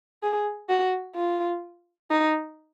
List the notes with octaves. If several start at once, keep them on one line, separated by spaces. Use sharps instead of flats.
G#4
F#4
F4
D#4